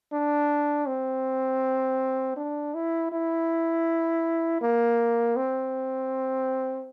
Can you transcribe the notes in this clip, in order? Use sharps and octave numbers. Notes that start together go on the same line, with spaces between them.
D4
C4
D4
E4
E4
A#3
C4